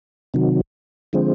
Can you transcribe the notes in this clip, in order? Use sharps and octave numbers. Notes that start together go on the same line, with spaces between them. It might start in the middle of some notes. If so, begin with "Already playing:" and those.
C3 D#3 F#3
D3 F3 G#3 C4